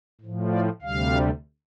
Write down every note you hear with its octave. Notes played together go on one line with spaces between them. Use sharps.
A2 F3
D5
D2 C3 G3 F5